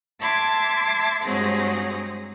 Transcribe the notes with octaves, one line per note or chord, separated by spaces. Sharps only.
E5 A5 C6 D6 G#6
G2 F#3 G#3 C4 G#4 A#6